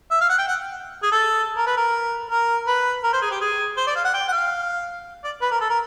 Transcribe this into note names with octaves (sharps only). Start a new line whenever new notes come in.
E5
F5
F#5
G5
F#5
G#4
A4
A#4
B4
A#4
A#4
B4
A#4
C5
G#4
G4
G#4
C5
D5
F5
F#5
G5
F#5
F5
D5
B4
A#4
A4
A#4